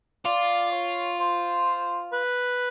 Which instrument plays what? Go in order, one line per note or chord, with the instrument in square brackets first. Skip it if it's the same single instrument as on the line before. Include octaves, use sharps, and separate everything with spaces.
[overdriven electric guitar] F4 [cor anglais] D5
[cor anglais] C#5
C5
B4